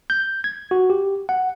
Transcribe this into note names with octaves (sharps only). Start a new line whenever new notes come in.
G6
G#6
F#4
G4
F#5